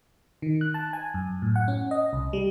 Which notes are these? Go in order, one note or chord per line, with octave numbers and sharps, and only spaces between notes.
D#3
F#6
A5
G#5
F#2
A2
F#5
C#4
D#5
C2
G3